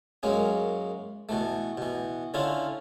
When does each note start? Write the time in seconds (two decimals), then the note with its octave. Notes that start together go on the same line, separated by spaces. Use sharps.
0.23 F#2 G#3 A#3 C#4
1.29 B2 E3 A3
1.77 B2 E3
2.34 D3 C#4 E4 F4